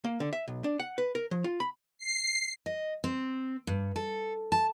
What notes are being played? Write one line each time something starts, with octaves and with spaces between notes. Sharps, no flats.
A#3
D3
E5
B1
D4
F#5
B4
A#4
F3
F4
B5
C7
D#5
C4
G2
A4
A5